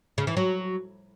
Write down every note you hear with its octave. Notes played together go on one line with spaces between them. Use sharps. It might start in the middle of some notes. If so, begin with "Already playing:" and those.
C#3
E3
F#3